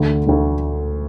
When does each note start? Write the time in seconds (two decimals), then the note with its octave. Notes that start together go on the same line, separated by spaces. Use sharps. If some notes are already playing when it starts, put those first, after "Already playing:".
Already playing: D2 D3 A3
0.26 D2 D3 A3